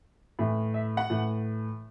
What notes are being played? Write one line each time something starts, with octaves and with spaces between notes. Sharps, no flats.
A2 E3
E5
F#5
A2 E3